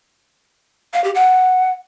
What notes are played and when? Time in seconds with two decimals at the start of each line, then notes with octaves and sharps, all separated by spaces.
0.93 F5
1.04 G4
1.15 F#5